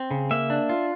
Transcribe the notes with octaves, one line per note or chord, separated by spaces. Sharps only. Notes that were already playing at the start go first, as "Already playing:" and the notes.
Already playing: C4
C#3
A#3 E5
D4
F4